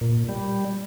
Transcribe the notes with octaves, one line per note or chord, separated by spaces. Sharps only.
A#2
G3